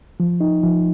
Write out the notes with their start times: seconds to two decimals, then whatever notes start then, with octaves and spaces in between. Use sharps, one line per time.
0.20 F3
0.41 D#4
0.63 F3